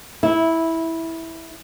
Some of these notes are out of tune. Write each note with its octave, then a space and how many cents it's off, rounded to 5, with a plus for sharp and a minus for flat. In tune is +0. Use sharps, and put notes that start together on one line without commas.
E4 -10